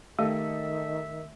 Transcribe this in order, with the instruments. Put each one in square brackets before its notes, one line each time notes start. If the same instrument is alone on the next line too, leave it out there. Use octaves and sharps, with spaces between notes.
[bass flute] D#3 [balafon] A3 [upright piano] G4 A4 D#5 [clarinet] E5